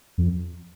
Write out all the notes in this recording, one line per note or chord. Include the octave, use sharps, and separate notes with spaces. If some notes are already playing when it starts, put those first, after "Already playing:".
F2